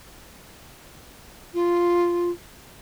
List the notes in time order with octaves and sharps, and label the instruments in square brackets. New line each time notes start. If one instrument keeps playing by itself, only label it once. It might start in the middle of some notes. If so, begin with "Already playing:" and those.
[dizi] F4